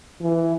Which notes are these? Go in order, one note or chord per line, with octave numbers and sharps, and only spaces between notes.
E3